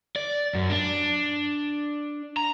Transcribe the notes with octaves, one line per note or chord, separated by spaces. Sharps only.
D5
F#2
D4
A#5